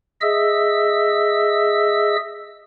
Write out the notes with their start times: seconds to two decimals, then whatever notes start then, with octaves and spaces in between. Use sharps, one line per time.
0.21 G#4 D#5 E5 E6